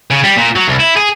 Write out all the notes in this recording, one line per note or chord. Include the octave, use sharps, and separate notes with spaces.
C#3
G3
A#2
F#3
C2
E4
G#4